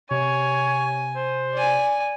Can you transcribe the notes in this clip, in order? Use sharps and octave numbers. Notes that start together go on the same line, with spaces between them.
C3 C#5 G#5
C5
D5 G#5